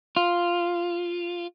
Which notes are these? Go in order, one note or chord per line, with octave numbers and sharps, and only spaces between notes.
F4